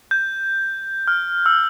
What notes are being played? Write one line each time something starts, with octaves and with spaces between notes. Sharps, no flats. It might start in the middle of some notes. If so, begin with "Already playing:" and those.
G6
F6
E6